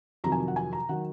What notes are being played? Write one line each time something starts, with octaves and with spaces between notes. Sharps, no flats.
F2 C3 D#3 F#3 A#5
G#5
F#5
G#5
A#5
D#3 F#3 F#5